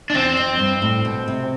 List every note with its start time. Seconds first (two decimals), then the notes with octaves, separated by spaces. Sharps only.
0.10 D4
0.14 E2 C4
0.37 F2
0.59 G2
0.82 A2
1.05 B2
1.28 C3